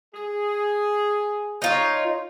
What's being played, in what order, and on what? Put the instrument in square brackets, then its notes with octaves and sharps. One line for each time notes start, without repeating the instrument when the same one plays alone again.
[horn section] G#4
[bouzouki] D#4 F4 C#5